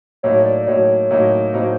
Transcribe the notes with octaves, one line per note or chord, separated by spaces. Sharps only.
A2 F#3 A#3 D#4 C#5
D5
A2 F#3 A#3 D#4 C#5
A2 F#3 A#3 D#4
A2 F#3 A#3 D#4 C5